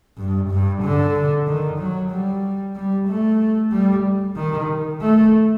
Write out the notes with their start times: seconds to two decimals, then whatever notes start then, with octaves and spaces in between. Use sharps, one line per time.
0.17 G2
0.50 G2
0.83 D3
1.47 D#3
1.79 F#3
2.11 G3
2.76 G3
3.08 A3
3.72 G3
4.36 D#3
5.01 A3